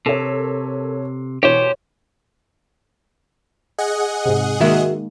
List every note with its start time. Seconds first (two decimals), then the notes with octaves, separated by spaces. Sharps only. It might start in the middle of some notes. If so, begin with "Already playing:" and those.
0.06 C3 A4 A#4 C#5
1.43 B2 E3 G4 C5 C#5
3.78 G#4 D#5 F#5
4.25 G#2 C3
4.61 D#3 G#3 A#3 F#4 E5